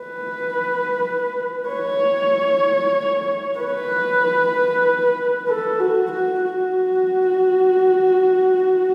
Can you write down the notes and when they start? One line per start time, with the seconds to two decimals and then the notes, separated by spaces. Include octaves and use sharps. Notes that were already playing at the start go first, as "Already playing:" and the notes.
Already playing: B4
1.69 C#5
3.59 B4
5.48 A4
5.80 F#4
6.12 F#4
6.44 F#4